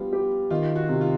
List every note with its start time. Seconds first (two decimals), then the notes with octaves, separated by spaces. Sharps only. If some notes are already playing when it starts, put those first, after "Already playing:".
Already playing: G3 B3 D4 F4
0.13 G4
0.50 D#3 F4
0.76 F#4
0.89 C3
1.01 F4